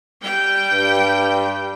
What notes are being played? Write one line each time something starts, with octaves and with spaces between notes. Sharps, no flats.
G3 G5
G2